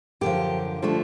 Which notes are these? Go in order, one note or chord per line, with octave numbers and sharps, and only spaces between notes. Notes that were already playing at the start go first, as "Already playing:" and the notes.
F#2 D3 F3 G4
D3 F3 A3